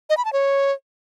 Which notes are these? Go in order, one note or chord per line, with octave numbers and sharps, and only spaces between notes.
D#5
B5
A5
C#5